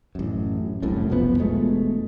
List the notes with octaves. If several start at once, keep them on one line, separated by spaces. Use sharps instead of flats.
A1 F#2
F1 C2 F#2 A2
B1 F2 F3 B3
E1 B2 G#3 A3